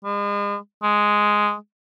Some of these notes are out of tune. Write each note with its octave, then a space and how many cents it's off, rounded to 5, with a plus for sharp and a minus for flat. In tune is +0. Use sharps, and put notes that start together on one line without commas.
G#3 -40
G#3 +0